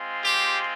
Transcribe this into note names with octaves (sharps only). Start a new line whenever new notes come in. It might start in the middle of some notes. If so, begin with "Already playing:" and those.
Already playing: G#3 C4 F4
G4